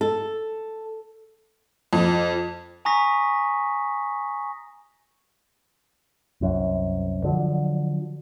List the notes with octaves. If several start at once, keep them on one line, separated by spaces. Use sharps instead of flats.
A4
F2
G#5 A#5 C#6 D#6 A#6 B6
C2 F#2
D3 F3 F#3